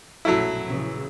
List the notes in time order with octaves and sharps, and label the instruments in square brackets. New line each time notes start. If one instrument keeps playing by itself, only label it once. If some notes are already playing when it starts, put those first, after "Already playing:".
[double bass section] A#1 F#2 B2 [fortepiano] F#3 A3 E4
[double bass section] A#1 C#3 E3